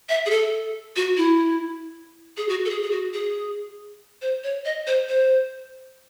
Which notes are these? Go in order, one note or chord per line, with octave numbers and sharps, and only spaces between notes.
E5
G#4
A4
F#4
E4
G#4
F#4
A4
G#4
G#4
F#4
G#4
C5
C#5
D#5
C5
C5